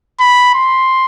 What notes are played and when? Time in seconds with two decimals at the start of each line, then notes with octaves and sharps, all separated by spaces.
0.20 B5
0.54 C6